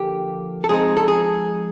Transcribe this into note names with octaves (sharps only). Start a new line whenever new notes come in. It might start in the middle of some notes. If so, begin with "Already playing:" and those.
Already playing: D3 F3 A#3 G4
A4
F3 G#3 C4 D#4 G#4
A4
G#4